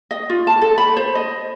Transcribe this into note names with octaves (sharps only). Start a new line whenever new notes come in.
D#5
F4
A5
A4
B5
C5
D#5